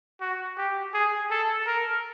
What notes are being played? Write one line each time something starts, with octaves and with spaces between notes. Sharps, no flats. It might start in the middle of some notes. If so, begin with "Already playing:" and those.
F#4
G4
G#4
A4
A#4